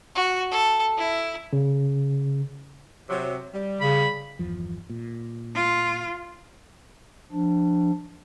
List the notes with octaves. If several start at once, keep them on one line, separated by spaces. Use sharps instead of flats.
F#4
A4
E4
C#3
C3 F#3
G3
C#3 B5
G1 E2 F3
A#2
F4
F3 D4